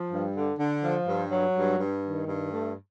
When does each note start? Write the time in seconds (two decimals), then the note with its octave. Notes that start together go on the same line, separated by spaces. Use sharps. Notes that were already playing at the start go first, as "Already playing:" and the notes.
Already playing: F3
0.11 G2
0.35 D3
0.58 D3
0.83 F3
1.07 G2
1.31 F#3
1.55 G2
1.78 G2
2.04 D#3
2.27 G2
2.51 A3